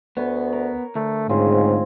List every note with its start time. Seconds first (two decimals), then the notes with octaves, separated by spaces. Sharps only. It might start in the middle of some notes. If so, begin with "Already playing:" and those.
0.17 D2 B3 C#5
0.53 A#4
0.95 D2 A3
1.29 G#2 C#3 C4 F4 G#4